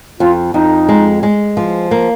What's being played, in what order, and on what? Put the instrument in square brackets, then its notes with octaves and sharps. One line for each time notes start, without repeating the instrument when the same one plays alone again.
[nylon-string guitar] F2 [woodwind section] F4
[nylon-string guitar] F2 [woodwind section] D#4
[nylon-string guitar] G#3
G#3
F3
A#3